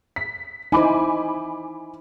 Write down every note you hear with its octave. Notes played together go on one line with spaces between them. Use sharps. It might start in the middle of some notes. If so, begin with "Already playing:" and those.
B6
D#4 E4 C5 G#5 B5 D6